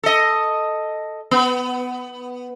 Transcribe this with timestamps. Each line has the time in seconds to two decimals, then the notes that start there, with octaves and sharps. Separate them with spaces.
0.03 A4 D#5
1.31 B3